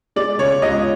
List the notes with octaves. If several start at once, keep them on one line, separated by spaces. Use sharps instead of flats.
G#3 D5
C#3 C#5
C#2 D#5